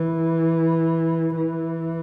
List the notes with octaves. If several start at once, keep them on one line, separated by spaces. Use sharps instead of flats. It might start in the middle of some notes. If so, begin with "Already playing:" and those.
Already playing: E3
E3